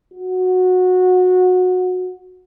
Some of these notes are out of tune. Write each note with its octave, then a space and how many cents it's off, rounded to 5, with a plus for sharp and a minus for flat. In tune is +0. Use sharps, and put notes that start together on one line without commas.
F#4 -15